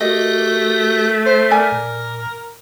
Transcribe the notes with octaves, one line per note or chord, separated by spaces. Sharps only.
A3 F#4 G4 A#4 D#5
C5
A#4 D5 G#5
A#2